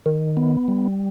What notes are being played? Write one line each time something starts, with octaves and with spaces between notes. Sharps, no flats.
D#3
B3
G3